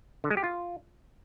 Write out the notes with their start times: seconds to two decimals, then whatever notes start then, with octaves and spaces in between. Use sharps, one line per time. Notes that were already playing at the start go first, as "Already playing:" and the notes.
0.24 D3
0.30 G#3
0.37 G4
0.44 F4